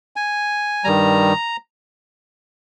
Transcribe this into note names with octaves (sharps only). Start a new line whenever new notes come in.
G#5
G2 D#3 G3 A#5